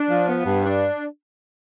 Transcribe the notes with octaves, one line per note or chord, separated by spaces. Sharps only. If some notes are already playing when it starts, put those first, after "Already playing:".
Already playing: D4
F3
B3
G2
D4